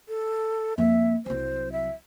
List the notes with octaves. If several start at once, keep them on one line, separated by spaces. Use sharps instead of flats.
A4
F2 A#3 E5
C2 F#3 C5
E5